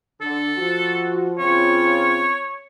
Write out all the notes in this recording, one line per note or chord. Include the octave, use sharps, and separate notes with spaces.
D3 A4
F3 F#4
C#3 C4 F4 C#5